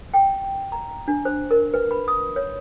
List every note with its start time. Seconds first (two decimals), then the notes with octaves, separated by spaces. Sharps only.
0.14 G5
0.72 A#5
1.08 D4
1.25 C5
1.51 A#4
1.74 B4
1.91 B5
2.08 D#6
2.36 C#5